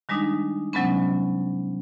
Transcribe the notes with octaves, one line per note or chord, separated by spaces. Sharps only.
D#3 G3 G#3 D4 D#4
C3 F#3 G#3 B3 C#4